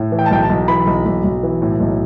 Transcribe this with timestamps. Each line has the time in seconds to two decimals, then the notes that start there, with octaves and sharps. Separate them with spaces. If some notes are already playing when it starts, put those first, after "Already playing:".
Already playing: A2
0.12 E3
0.19 G5
0.26 A5
0.31 B1 G5
0.43 A5
0.50 B1
0.68 E3 B5
0.87 B1
1.06 B1
1.25 B1
1.43 E3
1.62 A2
1.80 B1